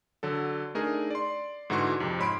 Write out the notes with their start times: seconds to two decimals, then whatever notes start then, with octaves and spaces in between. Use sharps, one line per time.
0.23 D3 F#3 A4
0.75 A3 D4 D#4 G#4 A#4
1.11 D5 C6
1.70 G#2 D3 E3 F#4 C6 C#6
2.00 F2 C3
2.18 G#2 C#5 B5 C6 D7